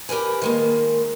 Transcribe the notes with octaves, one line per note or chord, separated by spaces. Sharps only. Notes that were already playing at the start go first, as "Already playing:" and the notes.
G4 A#4 B4 G#5
D#3 G#3 A#3